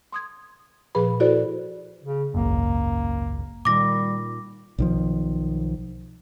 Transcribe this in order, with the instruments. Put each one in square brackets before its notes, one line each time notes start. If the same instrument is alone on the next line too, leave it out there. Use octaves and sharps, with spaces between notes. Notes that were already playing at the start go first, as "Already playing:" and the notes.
[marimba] C6 D#6 G#6
A#2 F3 G#4 B4 B5
E4 F#4 A4 C5 D5
[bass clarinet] C#3
[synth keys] G#1 C#2 F#2 [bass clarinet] A#3
[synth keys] A#2 D#3 [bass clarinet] G3 [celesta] D6 A#6
[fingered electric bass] B1 D#3 F3